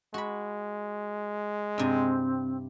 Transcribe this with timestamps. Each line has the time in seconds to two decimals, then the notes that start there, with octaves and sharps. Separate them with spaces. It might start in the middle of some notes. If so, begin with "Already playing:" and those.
0.14 G#3 F#4 B5
1.78 G2 C3 C4